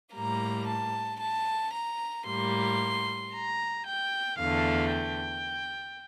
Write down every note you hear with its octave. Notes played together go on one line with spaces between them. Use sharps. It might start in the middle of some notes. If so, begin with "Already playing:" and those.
A2 G3 A#3 A#5
A5
A5
A#5
A2 G3 A#3 C6
A#5
G5
E2 D3 A3 F5
G5